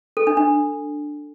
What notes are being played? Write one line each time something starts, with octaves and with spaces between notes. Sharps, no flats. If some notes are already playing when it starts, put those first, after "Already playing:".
A4
D4
D4